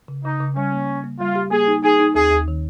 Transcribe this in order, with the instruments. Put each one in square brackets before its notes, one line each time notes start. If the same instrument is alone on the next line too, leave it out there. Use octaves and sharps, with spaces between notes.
[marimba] C#3
[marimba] C#3 [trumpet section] D#4
[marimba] C#3
[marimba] G3 [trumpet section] C#4
[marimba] A#3
A#3
A#3
[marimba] G3 [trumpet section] F4
[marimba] G4
[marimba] A#3 [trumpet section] G#4
[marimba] D#4
[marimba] D#4 [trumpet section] G#4
[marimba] D#4
[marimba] D#2 [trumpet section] G#4
[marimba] D#2
D#3